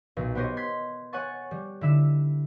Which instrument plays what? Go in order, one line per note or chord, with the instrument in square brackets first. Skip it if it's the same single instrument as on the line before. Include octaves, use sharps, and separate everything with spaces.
[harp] B1 A#2
B3 G4 C5 C#5 D#5
C6 G#6 B6
C#5 F#5 G#5 C#6 A6
G3
D3 E4 E5 E7